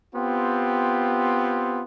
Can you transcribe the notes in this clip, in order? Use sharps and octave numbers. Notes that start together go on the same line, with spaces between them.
B3 C4 F4 G4